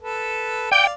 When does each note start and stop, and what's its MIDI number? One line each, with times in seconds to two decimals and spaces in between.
0.02 0.69 69
0.02 0.69 71
0.71 0.93 74
0.71 0.93 77
0.71 0.87 79